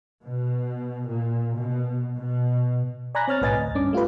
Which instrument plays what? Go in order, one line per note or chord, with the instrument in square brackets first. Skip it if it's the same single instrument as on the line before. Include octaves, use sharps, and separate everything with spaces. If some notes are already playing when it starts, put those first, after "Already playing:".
[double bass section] B2
A#2
B2
B2
[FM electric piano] D5 G#5 A#5 B5 F#6 A#6
C4 C#5 F6 A6
B1 A2 B4 D#5 G#5 A6
D2
G2 C#4 D4 D6
A3 F4 G4 B4